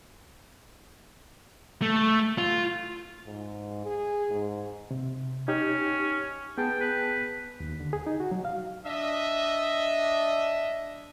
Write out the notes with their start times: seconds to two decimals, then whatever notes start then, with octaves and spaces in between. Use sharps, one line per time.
1.82 A3
2.38 F4
3.27 G#2
3.86 G#4
4.31 G#2
4.91 C3
5.48 C#4 D#4 G4 C#5
6.58 B3 G#4 G5 A5
6.81 B4
7.60 D#2
7.80 D3
7.93 G#4
8.06 D#4
8.20 F#4
8.32 F#3
8.45 F5
8.85 D4 D#5 E5